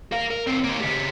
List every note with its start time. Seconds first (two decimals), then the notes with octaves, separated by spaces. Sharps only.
0.12 A#4 F5
0.31 A#4
0.47 D#2 C4
0.64 D#2 A#3
0.80 C#3 G4